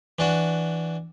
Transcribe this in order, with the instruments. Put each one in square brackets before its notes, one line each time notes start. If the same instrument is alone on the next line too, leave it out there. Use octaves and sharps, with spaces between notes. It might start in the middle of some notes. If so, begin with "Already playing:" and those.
[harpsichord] E3 D4 F#4